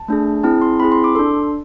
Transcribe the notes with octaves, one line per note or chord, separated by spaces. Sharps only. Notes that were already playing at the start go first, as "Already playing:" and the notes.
Already playing: A5
A3 D4 G#4
C4 E4 G#4 A5
C6
C4 E4 G#4 B5
C6
D6
D4 A4 C6